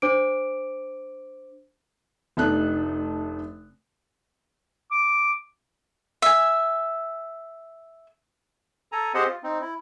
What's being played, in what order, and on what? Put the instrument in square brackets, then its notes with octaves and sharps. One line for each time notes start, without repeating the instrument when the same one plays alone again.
[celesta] D4 C5 D6 D7
[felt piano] F1 C3 A3 D4 D#4 F#6
[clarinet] D6
[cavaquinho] E5 G#5
[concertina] A4 G#5 A#5
C4 G4 G#4 C5 D#5 F#5
F4
C4 D#4
E4